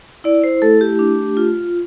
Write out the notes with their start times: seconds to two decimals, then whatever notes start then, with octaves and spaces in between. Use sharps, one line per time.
0.24 E4 D5
0.44 C5
0.62 A3 A4
0.81 G4
0.99 D4
1.37 F4